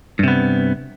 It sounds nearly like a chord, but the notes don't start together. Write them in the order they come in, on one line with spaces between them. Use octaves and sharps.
G2 C3 B3